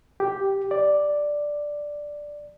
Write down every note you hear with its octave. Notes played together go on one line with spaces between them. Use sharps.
G4
D5